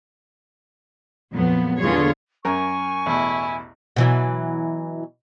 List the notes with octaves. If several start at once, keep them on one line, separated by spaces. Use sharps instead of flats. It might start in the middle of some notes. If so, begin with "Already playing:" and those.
F2 A#2 F#3 B3
E2 D3 B3 F4 G#4 C#5
F#2 A#4 G#5 C#6
A1 E2 B2 E4
B2 E3 F#3